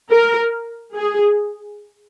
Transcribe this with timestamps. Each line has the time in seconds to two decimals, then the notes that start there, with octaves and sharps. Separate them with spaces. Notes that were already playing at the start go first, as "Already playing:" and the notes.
0.11 A#4
0.94 G#4